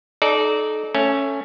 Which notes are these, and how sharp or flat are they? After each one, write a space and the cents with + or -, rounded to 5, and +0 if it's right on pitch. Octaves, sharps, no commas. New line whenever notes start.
D#4 -10 A4 -30 D5 -10
A3 +10 C#4 +0